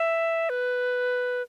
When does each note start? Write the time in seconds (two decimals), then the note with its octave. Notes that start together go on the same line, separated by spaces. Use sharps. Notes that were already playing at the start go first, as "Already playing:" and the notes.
Already playing: E5
0.49 B4